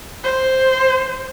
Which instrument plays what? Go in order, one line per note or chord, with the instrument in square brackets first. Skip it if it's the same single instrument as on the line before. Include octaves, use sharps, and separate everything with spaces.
[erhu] C5